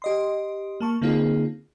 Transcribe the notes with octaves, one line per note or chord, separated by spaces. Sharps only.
G4 D#5 C6
A#3 A5 C#6
D3 A#3 C4 D#4 F4 G#4